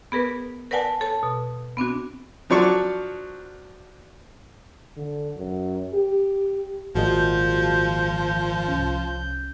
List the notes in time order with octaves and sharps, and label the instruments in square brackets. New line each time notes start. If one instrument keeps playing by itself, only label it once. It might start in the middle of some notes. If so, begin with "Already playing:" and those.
[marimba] B3 G#4 A#4 B4
A#4 B4 D5 F#5 G#5 A5
A4 C#5 A5
B2
B3 C4 D4 F#4
[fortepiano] F3 F#3 D4 C#6
[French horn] D3
F#2
G4
[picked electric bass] G#1 A#2 [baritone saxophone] F3 [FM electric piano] F#4 G#4 D#5 [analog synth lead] G6
[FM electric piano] C2 C#4